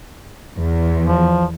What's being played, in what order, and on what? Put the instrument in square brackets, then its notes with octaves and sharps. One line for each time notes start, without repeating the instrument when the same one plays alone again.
[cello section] E2
[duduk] F3